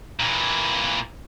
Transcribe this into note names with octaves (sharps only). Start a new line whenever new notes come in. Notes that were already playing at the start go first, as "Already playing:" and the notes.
A#2 E3